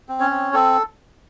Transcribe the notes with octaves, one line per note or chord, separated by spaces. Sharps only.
C4
C#4 C#5
C4
C4 A4